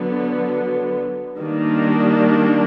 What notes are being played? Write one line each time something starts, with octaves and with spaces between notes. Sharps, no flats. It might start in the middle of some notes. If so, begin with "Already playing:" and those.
Already playing: D3 F#3 B3
D#3 G3 A#3 D4